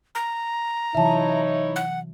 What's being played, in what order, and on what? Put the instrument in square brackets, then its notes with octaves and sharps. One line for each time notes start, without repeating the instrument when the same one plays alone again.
[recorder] A#5
[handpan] C3 E3 F#3 [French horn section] D#4 E4 C#5 [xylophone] E5 A5
[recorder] F#5